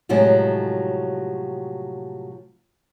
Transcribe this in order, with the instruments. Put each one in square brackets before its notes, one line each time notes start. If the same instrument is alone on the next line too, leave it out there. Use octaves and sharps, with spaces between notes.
[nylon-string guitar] A2 C3 F3 F#3 G#3